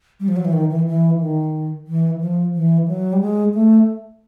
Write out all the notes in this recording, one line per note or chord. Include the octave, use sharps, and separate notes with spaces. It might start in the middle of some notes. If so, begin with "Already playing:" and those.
G3
F3
F#3
E3
D#3
E3
E3
D#3
E3
F3
E3
F#3
G3
G#3
A3